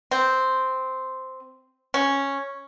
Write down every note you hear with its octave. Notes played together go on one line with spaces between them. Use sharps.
C4
C#4